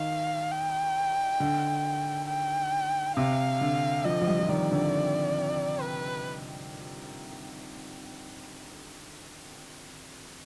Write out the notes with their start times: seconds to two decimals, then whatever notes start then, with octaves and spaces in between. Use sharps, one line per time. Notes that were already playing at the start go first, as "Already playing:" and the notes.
Already playing: D#3 F5
0.51 G5
1.40 D3
2.29 G5
3.16 C3 F5
3.61 D3
4.05 F3 D#5
4.22 F3
4.27 G3
4.39 F3
4.49 D#3 D5
4.72 D3
5.82 B4